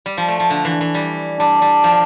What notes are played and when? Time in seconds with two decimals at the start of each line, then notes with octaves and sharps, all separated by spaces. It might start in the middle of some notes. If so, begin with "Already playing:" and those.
0.06 G3
0.17 F3
0.28 A3
0.40 F3
0.50 D3
0.65 E3
0.81 E3
0.95 G3
1.40 G3 D4
1.62 G3
1.84 F3